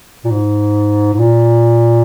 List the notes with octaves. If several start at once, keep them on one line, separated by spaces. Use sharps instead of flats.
A#2
G#2
G#2
A#2